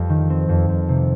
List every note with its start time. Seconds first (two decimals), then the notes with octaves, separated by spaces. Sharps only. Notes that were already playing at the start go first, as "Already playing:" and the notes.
Already playing: F2 G3
0.09 D#3
0.30 C4
0.49 F2
0.69 F2
0.89 C3